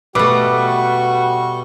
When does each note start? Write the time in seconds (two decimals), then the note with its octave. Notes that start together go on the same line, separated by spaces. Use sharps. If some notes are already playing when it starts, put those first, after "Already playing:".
0.15 B2 G3 A3 F#4 B4 C#6 D6